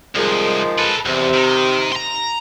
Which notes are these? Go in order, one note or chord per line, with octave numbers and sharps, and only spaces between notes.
C2 D#3 F3 G#3
A4 B4
E2 C3
D#3
A#5 C6